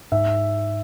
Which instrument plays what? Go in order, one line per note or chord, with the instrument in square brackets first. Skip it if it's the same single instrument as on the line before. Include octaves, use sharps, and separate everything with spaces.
[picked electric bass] G#2 [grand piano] E5